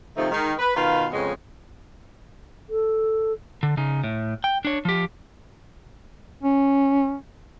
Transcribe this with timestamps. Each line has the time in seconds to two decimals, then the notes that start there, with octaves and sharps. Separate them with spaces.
0.16 C3 D#3 F3 A3 D#4
0.31 D#3 G#3
0.58 B4
0.75 B2 D#3 F4 B4 F5
1.11 F2 C#3 G#3 B3 C#5 D#5
2.69 A4
3.63 D3
3.77 C#3 D#4
4.04 A2
4.44 G5
4.65 D4 C#5
4.85 F3 G4
6.43 C#4